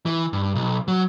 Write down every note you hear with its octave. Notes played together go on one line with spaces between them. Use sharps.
E3
G2
B1
F#3